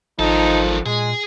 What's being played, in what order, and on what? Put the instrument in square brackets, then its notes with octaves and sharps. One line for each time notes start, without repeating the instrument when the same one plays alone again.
[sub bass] G#1 [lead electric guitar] D#3 A4 [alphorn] F3 [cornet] D#4
[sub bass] A#2 [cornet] G#3 [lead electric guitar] G#4